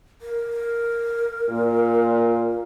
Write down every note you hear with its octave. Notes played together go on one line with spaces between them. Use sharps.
A#4
A#2